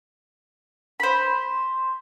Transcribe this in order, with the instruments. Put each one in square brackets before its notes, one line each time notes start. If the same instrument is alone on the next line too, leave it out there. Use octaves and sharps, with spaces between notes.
[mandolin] C5 B5